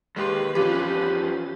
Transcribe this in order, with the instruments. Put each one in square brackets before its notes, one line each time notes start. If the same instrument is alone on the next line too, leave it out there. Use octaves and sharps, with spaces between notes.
[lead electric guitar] D#2 [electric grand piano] G#3 G4 C6 [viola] B4
[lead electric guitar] F2 E3 [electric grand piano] C#4 F4 B5 [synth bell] G4